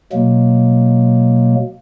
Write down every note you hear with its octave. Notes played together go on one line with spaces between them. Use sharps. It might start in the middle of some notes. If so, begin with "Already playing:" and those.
B2 F#3 G#3 A#3